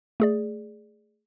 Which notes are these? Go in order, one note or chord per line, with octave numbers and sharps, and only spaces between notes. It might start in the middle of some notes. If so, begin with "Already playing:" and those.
A3 G#4 D5